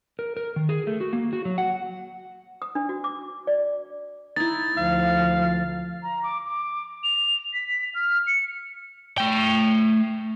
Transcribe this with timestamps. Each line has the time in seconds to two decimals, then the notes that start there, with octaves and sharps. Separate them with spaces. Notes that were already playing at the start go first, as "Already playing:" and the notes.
0.19 A#4
0.37 A#4
0.56 D#3
0.69 G#4
0.87 A3
1.00 F#4
1.13 A#3
1.33 F#4
1.45 F#3
1.58 F#5
2.62 D#6
2.75 D4
2.89 F#4
3.04 D6
3.47 D5
4.36 D#4 E4 A6
4.78 D2 F3 F5
6.03 A#5
6.23 D6
6.46 D6
7.04 F7
7.53 B6
7.95 F6
8.27 C#7
9.18 A3 G5